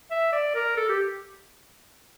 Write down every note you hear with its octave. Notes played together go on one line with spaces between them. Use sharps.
E5
D5
A#4
A4
G4